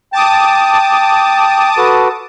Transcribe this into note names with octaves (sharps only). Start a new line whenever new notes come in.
G5 A5 D6 D#6
F#4 A4 B4